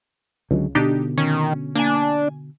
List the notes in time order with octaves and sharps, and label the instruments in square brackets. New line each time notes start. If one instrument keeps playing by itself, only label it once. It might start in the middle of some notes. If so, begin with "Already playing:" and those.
[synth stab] C#2 [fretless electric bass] D3 F#3 G#3
[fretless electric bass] B2 D3 [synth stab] D4 D#4 G4
[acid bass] D#3 [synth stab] C#4
[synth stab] A#3 G#5 [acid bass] D4